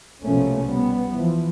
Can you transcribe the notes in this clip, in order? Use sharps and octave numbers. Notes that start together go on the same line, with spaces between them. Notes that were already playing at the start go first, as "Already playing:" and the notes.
C2 B2 F3 A3 A#3 C#4
G3 B3
E3 F3